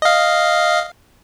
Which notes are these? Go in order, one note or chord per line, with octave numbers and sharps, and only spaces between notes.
D#5 F5